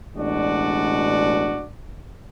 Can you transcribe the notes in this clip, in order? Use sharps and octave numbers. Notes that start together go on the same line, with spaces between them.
A1 B2 G#3 D4 F#4 D5